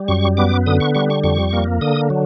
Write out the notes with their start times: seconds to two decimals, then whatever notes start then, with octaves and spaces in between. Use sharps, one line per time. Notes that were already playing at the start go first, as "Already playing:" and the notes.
Already playing: G3
0.08 F#2 C#6
0.37 B3 D6
0.66 D3 D#6
0.80 C#6
0.95 G3 C#6
1.10 C#6
1.24 F2 C#6
1.53 A#3
1.81 D3 D#6
2.10 F#3